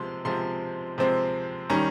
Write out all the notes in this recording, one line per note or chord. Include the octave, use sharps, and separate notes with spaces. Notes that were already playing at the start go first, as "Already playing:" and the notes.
Already playing: C3 F3 G#3 C6
C3 F3 G#3 C4 C6
C3 F3 G#3 C4
D#3 G3 C#4 A#5